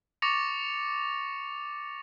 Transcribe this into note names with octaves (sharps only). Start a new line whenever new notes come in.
C#6 D6 A6 A#6 C#7 F7